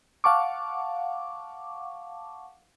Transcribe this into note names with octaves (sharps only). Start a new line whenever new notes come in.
F5 F#5 A5 C#6 D6